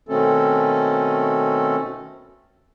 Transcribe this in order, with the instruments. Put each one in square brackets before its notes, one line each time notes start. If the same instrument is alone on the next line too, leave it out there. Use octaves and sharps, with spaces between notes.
[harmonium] B2 D#3 A3 C4 C#4 A4